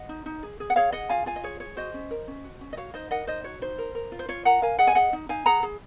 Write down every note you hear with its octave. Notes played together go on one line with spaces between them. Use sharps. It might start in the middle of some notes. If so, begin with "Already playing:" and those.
Already playing: D#5 F#5
D#4
D#4
G#4
G#4
F#5
G#4 C#5 F5
G#4 D#5 F#5
F4 F5 G#5
F4 F5 G#5
D#5
G#4 C#5
G#4 C#5
F#4 C5 D#5
C#4
A#4
C#4
F#4
C#4
D#5
F#4 C#5 F5
D#4 C5 D#5
A#4 D#5 F#5
D#4 C5 D#5
F#4 C#5
D#4 C5
A#4
A#4
F4
C5
F4 C#5
A#4 F#5 A#5
A#4 F5 G#5
G#4 D#5 F#5
G#5
G#4 D#5 F#5
D#4
D#4 F5 G#5
G#4 F#5 A#5
G#4